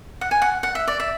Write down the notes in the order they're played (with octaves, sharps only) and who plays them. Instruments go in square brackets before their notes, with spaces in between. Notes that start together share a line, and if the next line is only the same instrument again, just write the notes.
[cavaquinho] F#5
G#5
F#5
F#5
E5
D5
E5